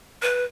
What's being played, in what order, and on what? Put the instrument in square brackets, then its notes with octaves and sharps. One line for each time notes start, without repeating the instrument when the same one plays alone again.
[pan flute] B4